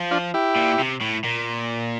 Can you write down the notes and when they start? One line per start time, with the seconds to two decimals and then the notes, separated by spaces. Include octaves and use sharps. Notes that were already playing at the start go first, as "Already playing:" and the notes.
Already playing: F3
0.11 D4 F4
0.34 E4 G4
0.56 A#2
0.80 C3
1.01 A2
1.24 A#2